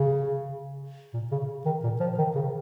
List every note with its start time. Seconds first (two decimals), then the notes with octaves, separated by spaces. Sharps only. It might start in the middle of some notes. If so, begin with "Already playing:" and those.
Already playing: C#3
1.14 A#2
1.32 C#3
1.65 D#3
1.84 A#2
2.00 F3
2.18 D#3
2.35 C#3